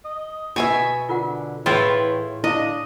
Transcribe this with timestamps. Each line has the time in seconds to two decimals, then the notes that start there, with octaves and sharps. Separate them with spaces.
0.05 D#5
0.56 B2 E5 G#5 C#6
1.09 D3 F4 A#4 F#5
1.66 A2 E3 E4 F4 G#4 G5 C6
2.44 D4 E4 D#5 F5